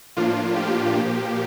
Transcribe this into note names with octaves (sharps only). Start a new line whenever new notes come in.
A2 F3 A#3 D4 F4
G4
A#2 F3 A#3